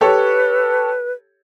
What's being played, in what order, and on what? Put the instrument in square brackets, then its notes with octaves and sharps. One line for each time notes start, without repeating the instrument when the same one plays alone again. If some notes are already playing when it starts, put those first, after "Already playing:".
[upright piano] G4 A4 C#5 [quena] B4